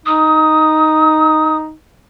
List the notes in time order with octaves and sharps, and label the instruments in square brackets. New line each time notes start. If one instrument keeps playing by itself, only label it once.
[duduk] D#4 [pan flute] D#6